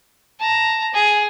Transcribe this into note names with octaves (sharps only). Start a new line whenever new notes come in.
A5 A#5
G#4